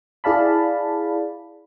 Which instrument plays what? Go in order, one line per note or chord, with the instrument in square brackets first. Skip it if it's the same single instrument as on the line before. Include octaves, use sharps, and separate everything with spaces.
[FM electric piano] E4 G#4 D5 F5 A5 B5